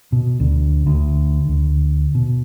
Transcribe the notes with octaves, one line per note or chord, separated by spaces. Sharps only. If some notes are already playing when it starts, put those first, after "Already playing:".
B2
D2
D2
D2
B2